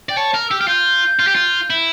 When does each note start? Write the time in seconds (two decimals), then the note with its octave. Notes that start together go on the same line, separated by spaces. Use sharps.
0.09 D5 G5
0.17 C#5 A5
0.34 A#4
0.49 G4 E6
0.59 G4 F6
0.68 F4 G6
1.19 F4
1.27 G4
1.35 F4
1.70 E4